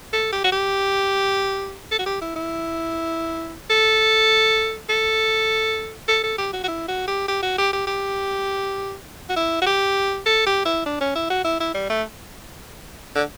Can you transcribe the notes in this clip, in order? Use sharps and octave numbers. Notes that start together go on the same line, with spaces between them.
A4
G4
F#4
G4
A4
F#4
G4
E4
E4
A4
A4
A4
A4
G4
F#4
F#4
E4
F#4
G4
G4
F#4
G4
G4
G4
F#4
E4
F#4
G4
A4
G4
E4
D4
C#4
E4
F#4
E4
E4
G3
A3
D3